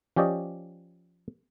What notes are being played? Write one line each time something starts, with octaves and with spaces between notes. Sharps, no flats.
F3 C#4 G4 D5 D#5